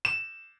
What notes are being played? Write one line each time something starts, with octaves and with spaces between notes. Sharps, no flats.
E7